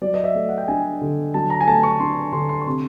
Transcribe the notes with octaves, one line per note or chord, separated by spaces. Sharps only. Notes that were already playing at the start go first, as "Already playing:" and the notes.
F#3 D5
D#5
E5
A3
F#5
G5
D4 G#5
D3
F#3 A5
A#5
G#5
A3 A5
C#6
D4 C6
D3 C6
C6
C#6
C3 C6